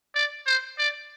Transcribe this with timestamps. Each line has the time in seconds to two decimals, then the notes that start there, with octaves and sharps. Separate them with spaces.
0.15 D5
0.47 C5
0.78 D5